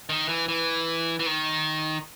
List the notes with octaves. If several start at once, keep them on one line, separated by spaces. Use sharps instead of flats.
D#3
E3
E3
E3
D#3